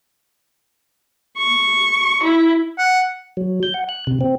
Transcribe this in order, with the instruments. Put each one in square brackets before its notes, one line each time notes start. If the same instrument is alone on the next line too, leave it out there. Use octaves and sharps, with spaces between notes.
[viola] C#6
E4
[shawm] F#5
[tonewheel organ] F#3
G6
F#5
F#6
C3
C4